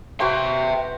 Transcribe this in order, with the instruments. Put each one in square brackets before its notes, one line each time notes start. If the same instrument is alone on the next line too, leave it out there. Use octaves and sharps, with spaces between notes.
[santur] F#4 B4 C5 [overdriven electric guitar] E5 G5